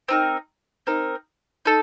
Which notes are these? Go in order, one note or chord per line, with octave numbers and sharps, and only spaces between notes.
C4 D#4 A#4
C4 D#4 A#4
D#4 A4